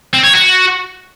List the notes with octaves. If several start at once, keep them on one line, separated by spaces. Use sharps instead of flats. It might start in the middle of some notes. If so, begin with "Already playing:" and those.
C4
C#5
F#4